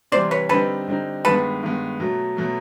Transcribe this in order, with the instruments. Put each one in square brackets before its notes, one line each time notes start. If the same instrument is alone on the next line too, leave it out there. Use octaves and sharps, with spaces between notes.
[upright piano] C3 E3 G3 [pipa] C5 D5
[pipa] B4 C#5
[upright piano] D3 G3 C4 D#4 [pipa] A4 B4
[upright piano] D3 G3 C4 D#4
[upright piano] G2 D#3 G#3 B3 [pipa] A4 B4
[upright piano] G2 D#3 G#3 B3
B2 F#3 A3
B2 F#3 A3